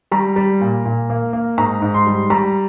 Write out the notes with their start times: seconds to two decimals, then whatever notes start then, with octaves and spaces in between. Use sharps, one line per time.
0.11 G3 A#5
0.36 G3
0.61 A#2
0.85 A#2
1.10 A#3
1.33 A#3
1.57 G#2 A#5
1.82 G#2
1.94 C6
2.07 G3
2.30 G3 A#5